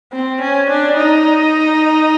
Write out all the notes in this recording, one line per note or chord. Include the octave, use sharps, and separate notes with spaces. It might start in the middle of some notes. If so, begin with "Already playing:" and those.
C4
C#4
D4
D#4